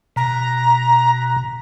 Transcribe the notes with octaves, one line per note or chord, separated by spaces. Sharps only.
B2 A#5